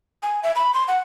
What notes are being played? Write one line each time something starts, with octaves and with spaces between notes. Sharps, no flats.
G#5
E5
B5
C6
F#5